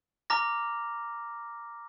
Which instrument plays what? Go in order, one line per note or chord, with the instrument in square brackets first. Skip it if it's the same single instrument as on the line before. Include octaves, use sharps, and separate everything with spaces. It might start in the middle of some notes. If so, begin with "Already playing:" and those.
[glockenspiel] A#5 D6 F6 A#6